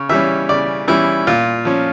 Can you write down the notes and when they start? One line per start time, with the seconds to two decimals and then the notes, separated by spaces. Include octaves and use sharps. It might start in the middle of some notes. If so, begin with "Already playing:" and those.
Already playing: C#3 C#5
0.09 E3 G3 C#4 E5
0.49 C#3 D5
0.88 E3 G3 C#4 E4
1.27 A#2 F4
1.65 F3 C#4